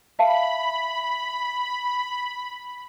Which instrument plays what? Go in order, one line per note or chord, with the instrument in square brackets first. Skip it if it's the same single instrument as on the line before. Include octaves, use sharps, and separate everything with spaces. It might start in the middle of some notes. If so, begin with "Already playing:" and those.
[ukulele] E5 F5 A5 [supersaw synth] B5